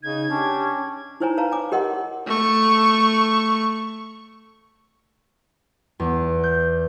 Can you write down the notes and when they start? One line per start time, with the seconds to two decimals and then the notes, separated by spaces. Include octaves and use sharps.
0.03 C#3 D#4 G#6
0.30 C#4 D4 G4
1.20 D#4 E4 C5 C#5 G#5 A#5
1.37 B4 C#5 F5 A5 A#5
1.52 G#5 D6
1.72 G4 A#4 D#5 F#5 C6
2.27 A3 C#6
6.00 E2
6.43 G6